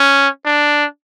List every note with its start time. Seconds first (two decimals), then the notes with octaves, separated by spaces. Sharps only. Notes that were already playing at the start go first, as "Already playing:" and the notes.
Already playing: C#4
0.45 D4